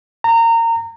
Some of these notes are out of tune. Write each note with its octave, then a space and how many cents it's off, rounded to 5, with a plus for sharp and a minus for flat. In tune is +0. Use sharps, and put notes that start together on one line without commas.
A#5 -25